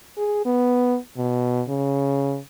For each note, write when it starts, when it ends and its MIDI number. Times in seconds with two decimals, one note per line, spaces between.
0.17 0.43 68
0.45 0.97 59
1.17 1.62 47
1.68 2.38 49